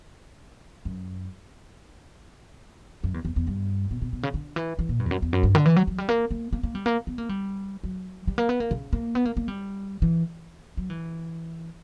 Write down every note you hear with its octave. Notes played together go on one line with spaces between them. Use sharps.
F#2
F#2
E2
E2
E2
G2
B2
B2
B2
C#3
D3
E3
E3
A#2
G2
E2
F#2
E2
F#2
G2
D3
E3
F#3
F#3
G3
A#3
A#3
A#3
A#3
G3
A#3
B3
A#3
G3
F#3
G3
A#3
B3
A#3
C#3
A#3
B3
A#3
A#3
G3
E3
F#3
E3